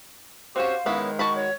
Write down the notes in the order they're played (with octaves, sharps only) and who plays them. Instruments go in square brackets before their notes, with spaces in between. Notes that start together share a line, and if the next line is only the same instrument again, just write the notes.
[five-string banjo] C4 C#4 [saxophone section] F#4 G4 C5 [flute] F5
[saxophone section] D#3 G#3 [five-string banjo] B3 C#4 E4
[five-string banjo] F#4 A5 B5 [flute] C#6
[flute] C#5